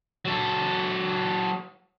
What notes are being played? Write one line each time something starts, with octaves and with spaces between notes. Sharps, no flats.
F#3 A4